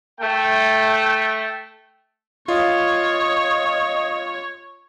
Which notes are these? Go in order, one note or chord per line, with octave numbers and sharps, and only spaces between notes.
A3 G5
F4 C#5 D#5